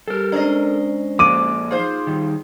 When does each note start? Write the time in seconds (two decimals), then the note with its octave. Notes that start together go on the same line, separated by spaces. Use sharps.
0.08 G3 G4 A4 A#4
0.32 G#3 C#4 D4 C5 D#5
1.19 F3 A#3 A4 D6 D#7
1.71 D#4 F4 G#4 C5
2.07 D#3 G3